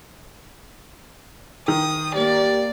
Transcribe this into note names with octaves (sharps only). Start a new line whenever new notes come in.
D#3 D#6
A#3 G4 D5